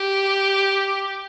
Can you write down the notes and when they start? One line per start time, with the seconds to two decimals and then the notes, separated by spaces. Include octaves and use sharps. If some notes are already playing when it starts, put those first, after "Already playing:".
Already playing: G4